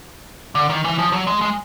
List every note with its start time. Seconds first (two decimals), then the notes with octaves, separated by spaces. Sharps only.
0.55 D3
0.70 D#3
0.84 E3
0.98 F3
1.12 F#3
1.27 G#3
1.41 G#3